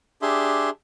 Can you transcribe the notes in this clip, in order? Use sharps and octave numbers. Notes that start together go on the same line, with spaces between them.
D4 G4 G#4 E5 C6